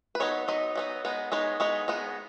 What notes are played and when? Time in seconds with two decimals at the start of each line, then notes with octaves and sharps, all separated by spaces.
0.15 B4
0.20 F#3 B3 D#4 C#5
0.48 F#3 B3 D#4 D#5
0.75 F#3 B3 D#4
1.05 G#3 B3 D#4
1.32 G#3 B3 D#4 C#5
1.60 G#3 B3 D#4 C#5
1.88 G#3 B3 D#4